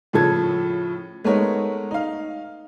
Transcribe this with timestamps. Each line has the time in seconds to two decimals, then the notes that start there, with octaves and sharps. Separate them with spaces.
0.13 A2 C#3 F3 A4 G#6
1.24 G#3 A3 B3 D#4 A#4 C#5
1.91 D#4 F5